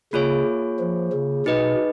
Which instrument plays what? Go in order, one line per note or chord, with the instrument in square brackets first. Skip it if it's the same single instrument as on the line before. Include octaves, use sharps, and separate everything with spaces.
[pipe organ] C#3 [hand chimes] A#3 F4 G#4 C#5
[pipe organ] F3
C#3
[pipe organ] B2 [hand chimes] D#4 G#4 B4 D#5